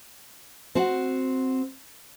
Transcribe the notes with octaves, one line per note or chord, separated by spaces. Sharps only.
C4 F#4 F#5